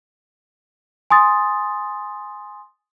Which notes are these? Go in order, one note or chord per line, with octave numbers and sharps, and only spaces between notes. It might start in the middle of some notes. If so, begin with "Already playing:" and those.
G#5 C6 D#6 A6